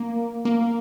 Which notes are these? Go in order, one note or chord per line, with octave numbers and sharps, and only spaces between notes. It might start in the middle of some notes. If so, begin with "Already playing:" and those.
Already playing: A#3
A#3